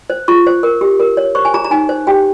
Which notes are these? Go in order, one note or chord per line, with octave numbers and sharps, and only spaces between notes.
C5
F4 C#6
C5
A#4
G4
A#4
C#5
C5 C#6
G#5
G#4 A#5
A#5
D#4 G#5
C5
G4 G5